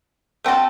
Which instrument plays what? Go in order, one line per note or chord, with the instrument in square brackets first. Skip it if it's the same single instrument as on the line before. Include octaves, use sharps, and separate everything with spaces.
[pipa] A3 C4 F#4 A4